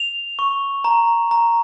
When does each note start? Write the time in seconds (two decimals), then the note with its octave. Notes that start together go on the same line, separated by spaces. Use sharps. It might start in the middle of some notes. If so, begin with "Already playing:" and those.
Already playing: F7
0.39 C#6
0.84 A#5
1.31 A#5